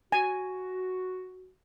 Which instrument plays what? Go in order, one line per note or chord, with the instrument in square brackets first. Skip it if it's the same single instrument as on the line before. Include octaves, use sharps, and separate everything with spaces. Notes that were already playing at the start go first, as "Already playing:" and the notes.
[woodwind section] F#4 [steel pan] G#5